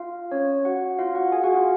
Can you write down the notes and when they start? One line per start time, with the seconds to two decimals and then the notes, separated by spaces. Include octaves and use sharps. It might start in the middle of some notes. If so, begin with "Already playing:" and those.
Already playing: F4 F5
0.31 C#4 C#5
0.65 F#4 F#5
0.99 F4 F5
1.15 F#4 F#5
1.32 G#4 G#5
1.43 F#4 F#5
1.54 F4 F5